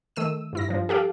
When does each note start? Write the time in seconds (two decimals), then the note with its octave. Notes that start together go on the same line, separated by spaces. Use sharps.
0.16 D#3 A3 E6 D#7
0.53 G2 E4 A#6
0.69 G2 F3
0.89 G4 A4 F5 D6